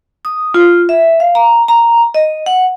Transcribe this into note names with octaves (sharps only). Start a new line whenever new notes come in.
D#6
F4
E5
F5
A#5
A#5
D#5
F#5